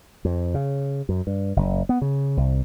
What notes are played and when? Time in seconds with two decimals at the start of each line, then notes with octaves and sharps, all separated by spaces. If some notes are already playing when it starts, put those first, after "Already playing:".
0.25 F2
0.54 C#3
1.09 F#2
1.27 G2
1.56 F#1
1.89 B3
2.02 C#3
2.37 C2